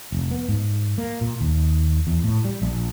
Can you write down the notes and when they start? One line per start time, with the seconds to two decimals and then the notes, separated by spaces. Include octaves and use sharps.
0.12 F1
0.31 B3
0.48 G#2
0.98 A#3
1.21 A#2
1.41 D#2
2.07 E2
2.24 A2
2.45 G3
2.62 A#1